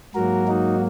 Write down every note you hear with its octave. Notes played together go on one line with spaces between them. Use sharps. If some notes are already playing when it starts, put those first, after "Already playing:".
G#2 F#3 A#3 F#4 A#4
D#4 F#4